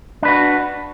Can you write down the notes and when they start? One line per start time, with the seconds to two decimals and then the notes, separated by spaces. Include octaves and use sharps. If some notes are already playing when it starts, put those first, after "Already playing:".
0.23 D4
0.25 B4
0.28 F#4